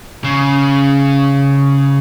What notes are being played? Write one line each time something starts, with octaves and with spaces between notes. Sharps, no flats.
C#3